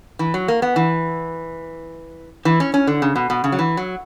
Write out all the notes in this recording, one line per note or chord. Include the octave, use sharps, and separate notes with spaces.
E3
F#3
A#3
B3
E3
E3
C#4
C#4
D3
C#3
B2
B2
C#3
F#3
E3
F#3